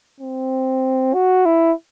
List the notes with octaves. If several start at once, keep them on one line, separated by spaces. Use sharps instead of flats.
C4
F#4
E4